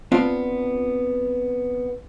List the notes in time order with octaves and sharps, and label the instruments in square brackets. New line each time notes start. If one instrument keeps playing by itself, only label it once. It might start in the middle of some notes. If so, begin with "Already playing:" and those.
[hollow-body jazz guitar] B3 C4 D4 F4